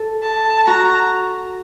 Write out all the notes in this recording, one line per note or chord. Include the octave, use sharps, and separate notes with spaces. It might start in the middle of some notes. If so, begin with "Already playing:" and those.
Already playing: A4
A5
F#4 A#5